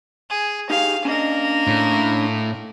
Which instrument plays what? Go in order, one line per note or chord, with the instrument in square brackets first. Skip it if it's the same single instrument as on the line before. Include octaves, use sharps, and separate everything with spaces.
[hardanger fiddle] G#4
[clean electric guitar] D#4 G4 G#4 [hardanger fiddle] F5
[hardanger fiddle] A#3 A#4 [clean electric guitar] C#4 D4 D#5
[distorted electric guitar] A2